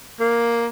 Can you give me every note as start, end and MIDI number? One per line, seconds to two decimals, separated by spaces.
0.20 0.67 58